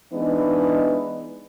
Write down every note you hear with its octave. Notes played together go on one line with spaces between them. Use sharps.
E3 G#3 B3 D4 D#4 B4